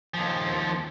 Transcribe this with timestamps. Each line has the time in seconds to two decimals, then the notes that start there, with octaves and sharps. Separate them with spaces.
0.14 D#2 F3